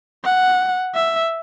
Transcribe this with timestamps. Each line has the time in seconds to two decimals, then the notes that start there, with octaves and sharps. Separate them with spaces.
0.25 F#5
0.95 E5